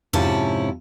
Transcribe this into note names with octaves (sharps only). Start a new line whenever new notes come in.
F2 G#2 C3 C#4 E4 A5